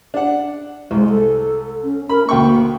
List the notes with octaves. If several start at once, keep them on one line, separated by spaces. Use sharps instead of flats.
D4 F#5
C2 G#3
A4
C#4
A#4 B5
D2 A#3 G5 C#6